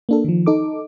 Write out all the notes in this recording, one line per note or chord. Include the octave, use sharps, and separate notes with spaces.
A#3 D4 A4
D#3 F3
D#4 A4 D6